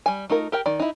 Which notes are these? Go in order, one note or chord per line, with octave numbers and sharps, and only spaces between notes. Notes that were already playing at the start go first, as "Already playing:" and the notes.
G3 G#5
A3 D#4 F4 A#4
G4 A#4 G5
D#3 D5
D#4 E4